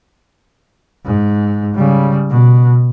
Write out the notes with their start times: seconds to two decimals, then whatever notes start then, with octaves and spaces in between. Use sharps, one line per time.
1.05 G#2
1.75 C#3 G3
2.30 B2